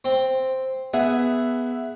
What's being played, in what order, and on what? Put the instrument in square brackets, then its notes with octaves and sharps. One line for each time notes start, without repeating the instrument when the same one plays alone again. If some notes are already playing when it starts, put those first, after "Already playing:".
[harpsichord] C4
[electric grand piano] B3 E5 F#5 [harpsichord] G#4